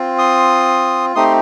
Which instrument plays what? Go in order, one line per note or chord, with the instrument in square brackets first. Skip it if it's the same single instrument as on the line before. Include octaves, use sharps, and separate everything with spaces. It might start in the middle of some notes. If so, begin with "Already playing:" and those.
Already playing: [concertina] C4 F4
C6 D#6
A3 C4 D#4 G4 C6 D#6